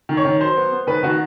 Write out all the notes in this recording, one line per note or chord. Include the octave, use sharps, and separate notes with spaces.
D#3
C#5
D#3
F#3 C5
B3
B3
D#3 B4
D#3 F#4